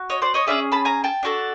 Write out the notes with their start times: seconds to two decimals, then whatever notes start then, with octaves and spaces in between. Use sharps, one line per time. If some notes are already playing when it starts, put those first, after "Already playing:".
Already playing: F#4
0.10 C#5 D#5
0.22 C5 D5
0.34 C#5 D#5
0.47 C#4 F4 G#4 D5 E5
0.72 A5 B5
0.85 G#5 A#5
1.04 G5 A5
1.23 D4 F#4 A4